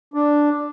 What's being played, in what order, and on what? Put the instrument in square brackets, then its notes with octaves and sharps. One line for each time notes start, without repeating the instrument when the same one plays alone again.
[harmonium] D4